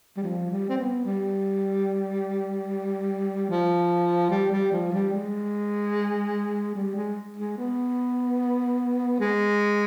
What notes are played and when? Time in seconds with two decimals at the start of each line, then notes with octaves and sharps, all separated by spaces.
0.17 G3
0.23 F3
0.50 G3
0.69 C4
0.78 B3
1.05 G3
3.50 F3
4.31 G3
4.52 G3
4.72 F3
4.92 G3
5.13 G#3
6.75 G3
6.96 G#3
7.37 G#3
7.58 B3
9.20 G#3